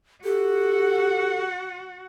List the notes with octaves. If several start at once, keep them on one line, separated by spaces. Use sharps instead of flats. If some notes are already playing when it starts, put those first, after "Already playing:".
F#4 G4 A4 F#5